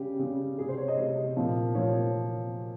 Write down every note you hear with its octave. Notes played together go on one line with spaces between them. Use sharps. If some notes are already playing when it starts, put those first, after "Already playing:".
Already playing: C#3 G3 G4
C#3 G3
C3 G3 G#4
C5
C#5
D#5
C3 G3
A#2 F3
A#2 F3 C#5